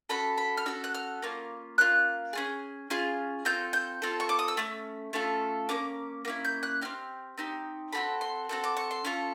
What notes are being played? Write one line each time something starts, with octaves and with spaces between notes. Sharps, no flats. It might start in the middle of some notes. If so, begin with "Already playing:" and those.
C#4 F#4 A4 B5
B5
F6
C#4 F#4 A4 E6
F#6
F6
A#3 C#4 F4
A#3 C#4 F4 F#6
C#4 F4 G#4
C#4 F4 G#4
C4 F4 A4 G6
G6
C4 F4 A4
C#6
D6
D#6
E6
A3 C#4
A3 C#4 F4 A4
A#3 C#4 D6
A#3 C#4 E4
G6
F#6
C4 D#4 G4 F6
C4 D#4 G4
C4 D#4 F#4 A4 B5
C6
C4 D#4 F#4 A4
D6
C#6
C6
C#4 F4 A4